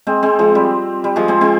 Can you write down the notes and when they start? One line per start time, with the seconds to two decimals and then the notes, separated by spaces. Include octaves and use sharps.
0.07 G#3 C4
0.23 G#3 C4
0.39 F3 G#3
0.55 G3
1.04 G3
1.16 F3 G#3
1.28 G#3 C4
1.41 G#3 C4